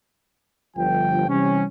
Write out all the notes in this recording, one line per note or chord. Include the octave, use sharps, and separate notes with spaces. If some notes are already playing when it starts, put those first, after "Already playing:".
G1 F3 G5
C3 E3 G3 C4 C#4